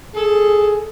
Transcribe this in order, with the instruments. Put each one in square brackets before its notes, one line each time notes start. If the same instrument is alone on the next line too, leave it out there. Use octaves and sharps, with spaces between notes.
[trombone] G#4 [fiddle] A4